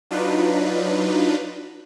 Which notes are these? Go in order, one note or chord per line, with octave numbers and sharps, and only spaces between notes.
F#3 D4 D#4 F4 B4